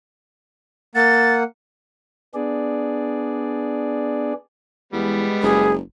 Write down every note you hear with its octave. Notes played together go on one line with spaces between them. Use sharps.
A#3 F#5 A6
B3 D4 G#4 D5
E2 G3 G#3 B3 B4
F#1 G#4